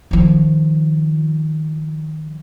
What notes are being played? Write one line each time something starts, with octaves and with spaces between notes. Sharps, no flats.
D#3 F3